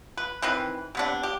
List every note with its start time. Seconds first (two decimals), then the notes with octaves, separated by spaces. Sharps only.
0.17 B4
0.42 D#3 E3 C4 B4
0.95 C3 B3 D4
1.23 G4